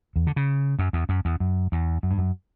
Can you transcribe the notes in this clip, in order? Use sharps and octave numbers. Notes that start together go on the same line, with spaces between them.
E2
D3
C#3
F#2
E2
F#2
E2
F#2
E2
F#2
G2
F#2